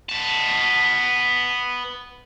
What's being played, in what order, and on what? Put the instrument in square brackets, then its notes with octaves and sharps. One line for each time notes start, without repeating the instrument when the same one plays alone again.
[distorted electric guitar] B3 A5